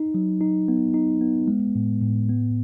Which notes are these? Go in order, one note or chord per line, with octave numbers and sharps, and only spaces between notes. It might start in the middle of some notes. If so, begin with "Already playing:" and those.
Already playing: D#4
F#3
D#4
B3
D#4
B3
G#3
A2
A2
B3